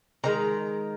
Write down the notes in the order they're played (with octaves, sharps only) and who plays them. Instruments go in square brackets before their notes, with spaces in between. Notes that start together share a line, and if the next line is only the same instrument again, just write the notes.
[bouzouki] C3 D#3 G#3 A#5